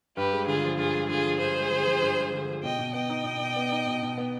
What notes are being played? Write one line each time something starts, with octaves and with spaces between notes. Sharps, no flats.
G2 G4 B4
G#3
D3 F4 G#4
F3
G2 F4 G#4
G#3
D3 F4 G#4
F3
G2 G#4 C5
G#3
D3
F3
G2
G#3
D3
F3
B2 D#5 G5
B2
B3 D#5 G5
D#4
B2
B2
B3
D#4
B2
B2
B3